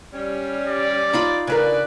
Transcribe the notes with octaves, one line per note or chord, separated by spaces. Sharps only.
G3 C#4
D5
D#4 F4 B5
C#3 D4 A#4 B4 D5